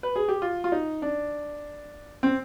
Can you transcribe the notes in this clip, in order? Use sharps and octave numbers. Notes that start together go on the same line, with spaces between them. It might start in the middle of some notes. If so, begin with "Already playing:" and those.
B4
G#4
G4
F4
F4
D#4
D4
C4